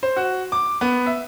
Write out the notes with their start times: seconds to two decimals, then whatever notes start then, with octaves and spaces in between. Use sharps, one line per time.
0.03 C5
0.16 F#4
0.52 D6
0.81 B3
1.06 E5